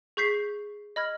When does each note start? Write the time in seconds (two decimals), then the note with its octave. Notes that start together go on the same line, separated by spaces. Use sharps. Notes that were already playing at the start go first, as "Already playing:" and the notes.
0.17 G#4 C#6 G6 B6 C7
0.96 D#5 B5 F6 G#6